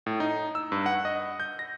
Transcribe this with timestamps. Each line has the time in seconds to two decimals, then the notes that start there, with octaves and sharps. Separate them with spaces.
0.06 A2
0.20 D#4
0.55 E6
0.72 G2
0.86 F#5
1.05 D#5
1.40 G6
1.59 A#6